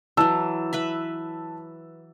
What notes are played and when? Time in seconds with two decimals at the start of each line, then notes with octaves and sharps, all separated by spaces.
0.17 E3 F#3 A5 E6
0.73 B4 E5 B5